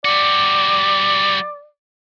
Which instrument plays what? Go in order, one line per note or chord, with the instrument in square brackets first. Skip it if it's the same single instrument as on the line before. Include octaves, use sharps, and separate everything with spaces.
[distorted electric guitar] G3 F#4 [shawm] D5